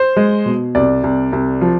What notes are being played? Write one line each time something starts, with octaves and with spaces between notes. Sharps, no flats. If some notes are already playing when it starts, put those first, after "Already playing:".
Already playing: C5
G#3
B2
C2 D5
C2
C2
F3